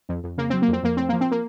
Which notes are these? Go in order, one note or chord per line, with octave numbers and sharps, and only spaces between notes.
F2
F2
C#3 A#3
F#3 C4
A#3
F2 C4
F2 A#3
A2 C4
F3 A#3
C4
A#3